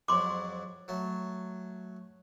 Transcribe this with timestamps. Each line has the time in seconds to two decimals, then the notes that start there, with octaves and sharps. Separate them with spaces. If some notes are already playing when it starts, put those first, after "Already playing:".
0.08 F2 G#2 F#3 C6 D6
0.88 F#3 A3